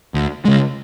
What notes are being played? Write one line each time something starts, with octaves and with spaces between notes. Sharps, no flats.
D2
C#3 G#3